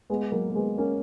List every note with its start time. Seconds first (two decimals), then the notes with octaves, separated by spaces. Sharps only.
0.10 G#3 B3
0.32 F#3 A#3
0.50 A#3
0.55 G#3 B3
0.78 A#3 C#4